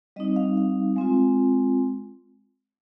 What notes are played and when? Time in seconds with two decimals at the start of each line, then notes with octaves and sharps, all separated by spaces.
0.16 G3 C4 D#4 D#5
0.36 F5
0.57 F5
0.96 G#3 C4 F4